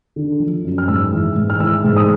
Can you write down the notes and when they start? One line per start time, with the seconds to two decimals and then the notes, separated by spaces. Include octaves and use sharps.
0.16 D3
0.40 F3
0.65 F#2
0.78 F6
0.88 G#2 E6
1.12 E3
1.36 G#2
1.50 F6
1.60 E3 E6
1.84 G#2
1.96 D#6